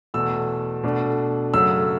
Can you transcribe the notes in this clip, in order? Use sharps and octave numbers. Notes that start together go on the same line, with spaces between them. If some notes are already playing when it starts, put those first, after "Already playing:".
E2 B2 A3 E6
B2 A3 D4
F#2 C#3 F#3 A3 E6